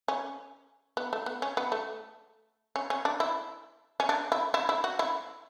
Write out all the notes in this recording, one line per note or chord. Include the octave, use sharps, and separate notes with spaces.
C#4
B3
A3
B3
C#4
B3
A3
C#4
C#4
D4
E4
C#4
D4
E4
E4
E4
F#4
E4